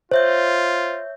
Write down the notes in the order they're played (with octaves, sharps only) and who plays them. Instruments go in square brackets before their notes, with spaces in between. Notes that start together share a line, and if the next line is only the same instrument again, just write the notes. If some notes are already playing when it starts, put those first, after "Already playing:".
[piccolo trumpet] F4 [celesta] C5 [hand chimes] C#5 E5 G6